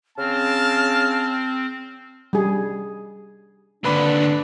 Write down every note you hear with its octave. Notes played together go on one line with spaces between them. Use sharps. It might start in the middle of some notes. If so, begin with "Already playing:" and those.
C#3 C4 A5 F6
G3 G#4
G#1 D#2 D3 D4 B4 B5